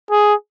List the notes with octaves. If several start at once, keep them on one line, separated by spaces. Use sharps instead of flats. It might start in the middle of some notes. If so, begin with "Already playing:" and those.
G#4